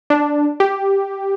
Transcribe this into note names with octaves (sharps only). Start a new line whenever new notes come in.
D4
G4